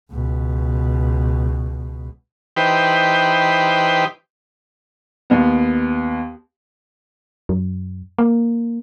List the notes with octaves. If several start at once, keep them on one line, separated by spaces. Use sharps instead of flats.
C#2 B2
E3 D#4 G4 B4 C5 G5
D#2 B3
F#2
A#3